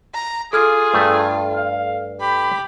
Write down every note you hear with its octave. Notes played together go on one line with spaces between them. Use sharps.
A#5
F4 G#4 A4 F6 G#6
G2 A3
F5
G4 B5